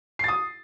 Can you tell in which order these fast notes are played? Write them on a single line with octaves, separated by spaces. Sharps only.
C7 A6 D#6